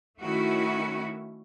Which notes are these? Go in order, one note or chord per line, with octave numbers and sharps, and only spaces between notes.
D#3 A3 C#4 E4 F#4